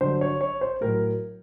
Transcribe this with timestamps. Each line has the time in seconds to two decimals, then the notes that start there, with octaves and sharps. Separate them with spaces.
0.01 G2 D3 F#3 C5
0.21 C#5
0.41 C#5
0.61 C5
0.81 A2 F#3 A#4